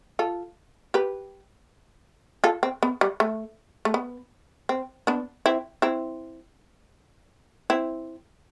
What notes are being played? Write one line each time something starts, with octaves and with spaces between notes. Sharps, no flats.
F4 A4
G4 B4
F4 A4
C4
B3
G3
A3
A3
B3
C4
B3 D4
C4 E4
C4 E4
C4 E4